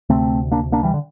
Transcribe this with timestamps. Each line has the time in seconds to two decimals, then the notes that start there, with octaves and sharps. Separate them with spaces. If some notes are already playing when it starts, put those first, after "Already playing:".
0.09 D2 C3 A3 C4
0.51 A#3 D4
0.72 A#3 D4
0.83 E3 G3
0.94 D3